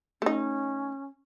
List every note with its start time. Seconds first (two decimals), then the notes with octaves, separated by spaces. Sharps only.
0.22 A3 C#4 D#4